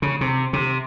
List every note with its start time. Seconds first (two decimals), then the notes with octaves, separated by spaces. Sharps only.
0.02 C#3
0.21 C3
0.53 C3